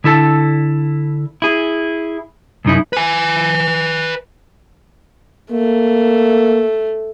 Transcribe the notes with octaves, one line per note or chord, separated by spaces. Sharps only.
D3 E4 A4 A5
E4 G#4
C2 F#2 D#4 E4
B4 G#5
A3 A#3